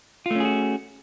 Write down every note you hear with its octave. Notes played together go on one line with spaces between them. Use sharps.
A3 C#4 F4 F#4 G#4